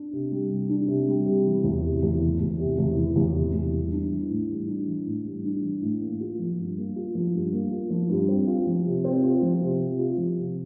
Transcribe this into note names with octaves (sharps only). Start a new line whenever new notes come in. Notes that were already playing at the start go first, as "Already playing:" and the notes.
Already playing: D4
C3
G3
C3
D4
C3
G3
C3
E3
E2
C3
E2
E3
E2
C3
E2
E3
E2
C3
E2
G3
D4
E3
A2
G3
D4
E3
A2
G3
D4
E3
A2
A#3
F4
F3
G2
A#3
F4
F3
G2
A#3
F4
F3
G2
C4
F4
F3
C3
C4
F4
F3
C3
C4
F4
F3
C3